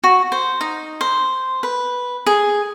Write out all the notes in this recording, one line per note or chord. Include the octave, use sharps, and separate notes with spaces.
F#4
C5
D#4
C5
B4
G#4